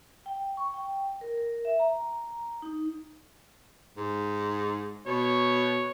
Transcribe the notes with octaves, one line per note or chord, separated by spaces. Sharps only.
G5
C#6
G5
A#4
A#4
E5
A#5
D#4
G#2
B2 C#5